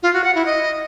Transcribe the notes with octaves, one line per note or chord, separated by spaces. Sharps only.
F4
F#4
F#5
E4
D#5